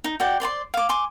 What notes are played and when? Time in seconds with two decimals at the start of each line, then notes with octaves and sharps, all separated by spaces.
0.04 D#4
0.20 F#4 D5 G5
0.40 C5 D5 G5 C6
0.74 F5 D6
0.89 G#5 C6 D6